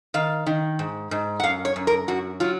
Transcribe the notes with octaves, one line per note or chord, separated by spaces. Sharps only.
D#3 F5
D#3
G#2
G#2
F#5
F#2 F5
C#5
F#2
A#4
F#2 F#4
F#3 F4